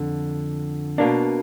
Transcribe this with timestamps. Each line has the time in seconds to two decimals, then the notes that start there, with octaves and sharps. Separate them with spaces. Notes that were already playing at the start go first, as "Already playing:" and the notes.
Already playing: F2 D3
0.98 B2 A#3 D4